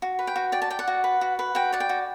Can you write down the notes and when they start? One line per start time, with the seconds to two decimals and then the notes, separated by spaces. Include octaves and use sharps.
0.02 F#4
0.19 B4
0.27 G5
0.36 F#4
0.52 D5 G5
0.62 A5
0.70 D5 G5
0.79 F#5
0.88 F#4
1.04 B4
1.21 F#4
1.39 B4
1.55 F#4 G5
1.73 D5 F#5
1.80 G5
1.89 F#4